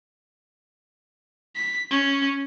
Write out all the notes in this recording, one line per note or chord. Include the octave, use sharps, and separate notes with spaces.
B6
C#4